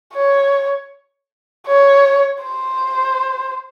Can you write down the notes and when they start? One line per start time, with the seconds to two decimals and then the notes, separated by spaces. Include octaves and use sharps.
0.14 C#5
1.68 C#5
2.44 C5